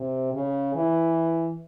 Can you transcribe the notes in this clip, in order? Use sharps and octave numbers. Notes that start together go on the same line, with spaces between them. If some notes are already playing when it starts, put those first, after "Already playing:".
Already playing: C3
C#3
E3